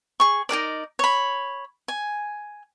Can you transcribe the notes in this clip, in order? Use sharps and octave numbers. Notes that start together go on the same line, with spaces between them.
G#4 C#6
D#4 G#4 A#4 D5
C#5 B5
G#5